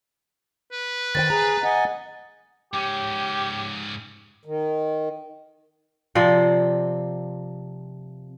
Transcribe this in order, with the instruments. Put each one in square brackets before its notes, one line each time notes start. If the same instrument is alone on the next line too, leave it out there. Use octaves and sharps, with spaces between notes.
[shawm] B4
[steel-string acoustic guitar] D#3 C5 G5 [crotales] A6
[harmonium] G#4 [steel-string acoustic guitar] A#5
[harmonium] D#5 F#5 G#5
[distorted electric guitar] G#2 C#4 [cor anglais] G4
[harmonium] D#3
[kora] C3 F3 C4 D5